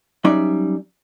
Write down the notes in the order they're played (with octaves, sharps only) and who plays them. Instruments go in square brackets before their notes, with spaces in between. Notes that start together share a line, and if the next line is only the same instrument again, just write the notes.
[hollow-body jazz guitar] F#3 G3 C#4 D#4 D5 E5